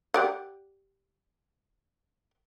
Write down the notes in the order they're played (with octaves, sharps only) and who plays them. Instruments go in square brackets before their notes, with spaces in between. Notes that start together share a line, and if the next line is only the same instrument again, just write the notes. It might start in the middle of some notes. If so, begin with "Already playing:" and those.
[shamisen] G4 D5 F#5